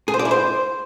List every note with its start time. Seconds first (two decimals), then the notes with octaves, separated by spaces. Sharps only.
0.08 G#4
0.14 C5
0.19 D5
0.25 E4
0.31 C5